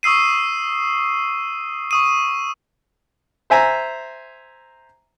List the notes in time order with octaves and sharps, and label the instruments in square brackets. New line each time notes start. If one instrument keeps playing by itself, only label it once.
[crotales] C#6 D#6 E6 C7 D#7
C#6 D#6 D#7
[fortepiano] C5 E5 G#5 A#5